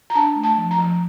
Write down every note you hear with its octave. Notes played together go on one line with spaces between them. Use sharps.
A#5
D4 A5
A3
A5
F3
A#5
F3